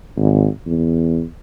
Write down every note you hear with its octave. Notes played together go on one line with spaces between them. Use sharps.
G#1
E2